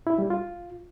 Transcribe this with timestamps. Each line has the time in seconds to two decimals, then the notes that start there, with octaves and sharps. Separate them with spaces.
0.07 E4
0.18 G3
0.30 F4